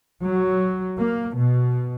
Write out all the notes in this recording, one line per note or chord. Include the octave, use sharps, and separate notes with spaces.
F#3
A#3
B2